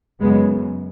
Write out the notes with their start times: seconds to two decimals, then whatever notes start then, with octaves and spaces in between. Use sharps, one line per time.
0.20 F#2 C#3 G#3 B3